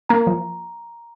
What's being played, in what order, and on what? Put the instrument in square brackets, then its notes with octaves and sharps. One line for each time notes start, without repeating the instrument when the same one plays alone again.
[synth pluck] A#3 [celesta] A#5
[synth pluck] F3